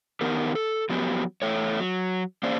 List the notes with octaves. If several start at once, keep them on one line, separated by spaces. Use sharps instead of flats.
D#3 B3 D#4 G4 A#4
A4
F3 F#3 B3 G4
E2 A3 C#5
F#3
A#3 C#4 G#4 C5 D5